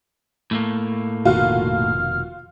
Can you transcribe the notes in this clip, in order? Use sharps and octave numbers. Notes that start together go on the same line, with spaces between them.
A2 A3 A#3
F1 B2 D#3 F4 F#4 F6